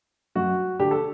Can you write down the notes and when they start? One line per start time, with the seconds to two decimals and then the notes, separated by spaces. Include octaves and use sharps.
0.35 F#2 F#4
0.80 D3 G4
0.91 A4